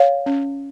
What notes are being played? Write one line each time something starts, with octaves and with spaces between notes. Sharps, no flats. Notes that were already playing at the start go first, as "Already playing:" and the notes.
Already playing: C#5 F5
C#4